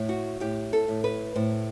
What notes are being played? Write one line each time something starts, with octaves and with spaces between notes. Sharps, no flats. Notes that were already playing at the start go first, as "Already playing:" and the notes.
Already playing: A2
F#4
A2 G4
A4
A2
B4
A2 C5